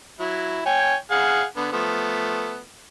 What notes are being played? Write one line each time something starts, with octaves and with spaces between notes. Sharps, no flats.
F#3 E4
C#5 G5 G#5
G#4 F5 F#5
D3 B3
F3 A3 B3